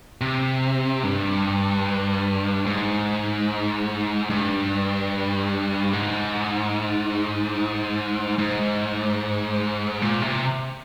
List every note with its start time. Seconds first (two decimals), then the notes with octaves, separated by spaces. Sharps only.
0.21 C3
1.03 G2
2.66 G#2
4.30 G2
5.93 G#2
8.38 G#2
10.02 A#2
10.22 C3